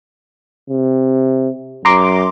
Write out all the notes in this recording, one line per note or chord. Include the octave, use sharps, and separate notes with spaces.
C3
F#2 A#5 C6 D6